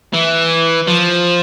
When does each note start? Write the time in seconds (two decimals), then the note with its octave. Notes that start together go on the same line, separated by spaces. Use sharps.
0.14 E3
0.87 F3